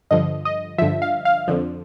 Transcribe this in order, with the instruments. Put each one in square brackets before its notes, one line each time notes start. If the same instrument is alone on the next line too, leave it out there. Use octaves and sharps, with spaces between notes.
[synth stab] G2 D3 F3 D#5
D#5
G2 D3 F3 E5
F5
F5
F2 D3 F3